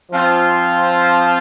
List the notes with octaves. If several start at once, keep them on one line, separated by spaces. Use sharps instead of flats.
F3 C4 F4